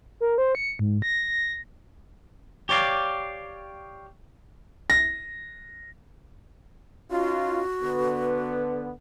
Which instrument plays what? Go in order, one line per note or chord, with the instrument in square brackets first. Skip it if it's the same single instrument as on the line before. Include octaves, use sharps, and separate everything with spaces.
[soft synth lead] A#4
C5
C#7
G#2
A#6
[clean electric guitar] G4 C#5 D5 F5
[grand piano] A#6
[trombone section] C#4 D#4 F4 [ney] F#4
[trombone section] D3 B3 [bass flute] B4